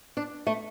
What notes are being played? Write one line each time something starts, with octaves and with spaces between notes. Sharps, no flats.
D4
A3